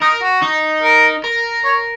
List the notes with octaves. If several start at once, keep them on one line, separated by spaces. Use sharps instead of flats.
D#4 A#4
F#4
D#4
A#4
A#4
C#5